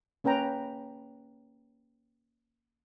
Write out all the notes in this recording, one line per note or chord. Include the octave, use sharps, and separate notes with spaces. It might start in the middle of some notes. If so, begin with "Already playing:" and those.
A#3 C#4 B4 G5 A#5